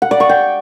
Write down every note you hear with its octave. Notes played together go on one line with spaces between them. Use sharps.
F#5
D5
C#6
G5